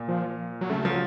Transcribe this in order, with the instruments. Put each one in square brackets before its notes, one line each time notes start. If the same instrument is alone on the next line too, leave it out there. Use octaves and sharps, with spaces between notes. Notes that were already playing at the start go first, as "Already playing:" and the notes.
Already playing: [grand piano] A#2
[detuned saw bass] F3
F#3
[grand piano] C#3 [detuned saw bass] A3
[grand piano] F3 [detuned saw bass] F#3